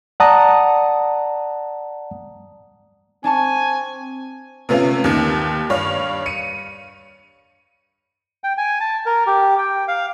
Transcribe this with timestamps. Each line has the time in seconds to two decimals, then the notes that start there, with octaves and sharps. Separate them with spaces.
0.20 D5 F#5 A5 A#5 D#6
3.24 C4 D4 G#5 A5 C#6
4.69 C3 A3 B3 C#4 F4
5.04 D#2 D#3
5.70 G2 C#5 F5
6.26 C#7 D#7
8.44 G5
8.58 G#5
8.80 A5
9.06 A#4
9.27 G4
9.58 G5
9.88 F5